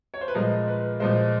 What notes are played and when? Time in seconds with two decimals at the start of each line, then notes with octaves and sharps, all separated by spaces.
0.14 C#5
0.21 C5
0.28 B4
0.35 A#2 F3 G#3 A#4
0.68 B4
1.00 A#2 F3 G#3 C5